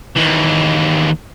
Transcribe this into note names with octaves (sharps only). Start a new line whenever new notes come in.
D#2 E3